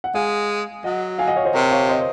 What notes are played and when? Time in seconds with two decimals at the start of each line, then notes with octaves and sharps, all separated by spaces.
0.04 F#5
0.14 G#3 F5 G#5
0.84 F#3 D#5 F#5
1.19 F5 G#5
1.27 D#5 F#5
1.36 C#5 F5
1.45 C5 D#5
1.54 C3 A#4 C#5
1.71 C#5 F5
1.89 C5 D#5